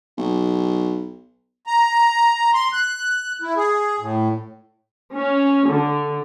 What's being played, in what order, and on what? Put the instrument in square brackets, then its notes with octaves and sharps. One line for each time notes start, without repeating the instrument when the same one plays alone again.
[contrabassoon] B1
[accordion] A#5
C6
F#6
E4
G#4
A2
[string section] C#4
D3